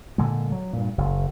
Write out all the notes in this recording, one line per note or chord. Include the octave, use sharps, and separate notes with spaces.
A#2 D3 G#3
F#3
G2 A#2
F#1